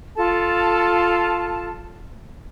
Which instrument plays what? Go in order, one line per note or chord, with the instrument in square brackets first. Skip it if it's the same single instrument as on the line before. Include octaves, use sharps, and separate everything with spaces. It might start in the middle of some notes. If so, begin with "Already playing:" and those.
[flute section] F4 A4 A5